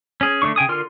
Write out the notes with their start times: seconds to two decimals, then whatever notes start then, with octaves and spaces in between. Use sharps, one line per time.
0.21 C#4 G#4
0.42 D3 A3 D4 C#6
0.56 C#3 G5 G#5 D#6
0.69 D3 F4 A#4 C6 F6